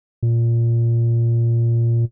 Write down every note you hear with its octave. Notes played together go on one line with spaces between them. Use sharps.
A#2